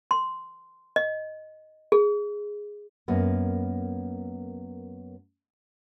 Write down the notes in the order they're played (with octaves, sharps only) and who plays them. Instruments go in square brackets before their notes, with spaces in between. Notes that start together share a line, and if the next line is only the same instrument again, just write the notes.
[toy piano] C6
D#5
G#4
[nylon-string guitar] F#2 A#3 B3